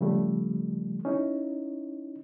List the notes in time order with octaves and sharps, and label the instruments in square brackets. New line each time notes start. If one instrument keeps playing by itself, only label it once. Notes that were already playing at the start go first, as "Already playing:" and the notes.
[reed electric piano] C#3 F3 G3 A3
C#4 D#4 E4